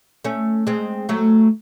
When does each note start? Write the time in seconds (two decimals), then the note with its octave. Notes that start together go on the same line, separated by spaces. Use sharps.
0.24 A3 C#4
0.67 G#3 C4
1.09 F#3 A3